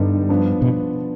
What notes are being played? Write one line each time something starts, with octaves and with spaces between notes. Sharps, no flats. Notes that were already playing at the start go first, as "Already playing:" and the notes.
Already playing: G2 D3 G3 B3 D#4
F3 B3 D4
B2